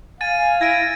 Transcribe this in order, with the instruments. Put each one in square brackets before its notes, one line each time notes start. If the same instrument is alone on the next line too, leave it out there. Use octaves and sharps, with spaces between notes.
[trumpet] F5 [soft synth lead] G#5 [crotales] A6 D#7
[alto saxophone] E4 [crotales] G#6 D7 D#7 [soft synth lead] A#6